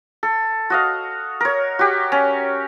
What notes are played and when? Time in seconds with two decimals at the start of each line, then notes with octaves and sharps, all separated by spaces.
0.23 A4
0.70 F#4 D#5 F5
1.41 A#4 C#5
1.79 F#4 G4
2.12 C#4